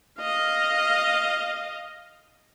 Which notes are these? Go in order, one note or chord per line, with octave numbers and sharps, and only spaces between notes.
D#5 F5